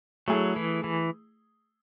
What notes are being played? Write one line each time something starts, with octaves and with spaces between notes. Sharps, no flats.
F#3 A3 E4 G#4
E3
E3